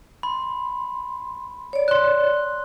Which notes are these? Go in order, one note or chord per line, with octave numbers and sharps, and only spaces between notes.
B5 C6
C#5 D5
C6 F#6